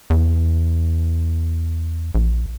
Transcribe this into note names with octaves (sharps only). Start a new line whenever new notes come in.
E2
A#1